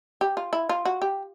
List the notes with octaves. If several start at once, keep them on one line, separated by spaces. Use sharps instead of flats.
G4
F4
E4
F4
F#4
G4